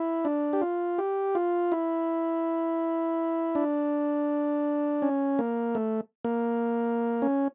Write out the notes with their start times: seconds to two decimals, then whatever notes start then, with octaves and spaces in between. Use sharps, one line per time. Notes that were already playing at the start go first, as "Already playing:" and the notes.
Already playing: E4
0.25 D4
0.53 G4
0.62 F4
0.98 G4
1.35 F4
1.72 E4
3.55 D4
5.02 C#4
5.39 A#3
5.75 A3
6.25 A#3
7.22 C#4